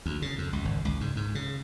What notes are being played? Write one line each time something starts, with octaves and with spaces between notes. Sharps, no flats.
D2
C#3
F2
C#2
G#1
C#2
G#2
G#2
C#3